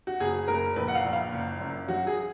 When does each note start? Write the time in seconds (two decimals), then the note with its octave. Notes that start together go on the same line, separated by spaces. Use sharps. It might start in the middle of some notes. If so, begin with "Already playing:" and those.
0.07 F#4
0.20 F#1 G#4
0.48 F#1 A#4
0.76 A#1 B4
0.88 F#5
0.95 F5
1.04 A#1
1.13 F5
1.32 F#1
1.60 F#2
1.88 F#3 F#4
2.07 G#4